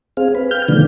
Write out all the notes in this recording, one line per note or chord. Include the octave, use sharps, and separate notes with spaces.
C4 G#4 F5
B4
F5 G5 F6 G6
B2 D3 D#3 F3 A3 D4